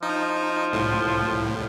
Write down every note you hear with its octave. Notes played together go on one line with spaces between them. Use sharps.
F3 D#4
C2 A2